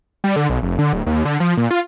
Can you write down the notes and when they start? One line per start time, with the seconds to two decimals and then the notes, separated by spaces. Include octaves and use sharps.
0.24 G3
0.36 D3
0.50 B1
0.63 F1
0.79 D3
0.93 D1
1.07 D#2
1.25 D3
1.40 F3
1.57 A#2
1.71 F4